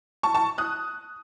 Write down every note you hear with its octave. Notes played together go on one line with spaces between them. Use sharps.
A5 C#6
A5 C#6
D#6 F#6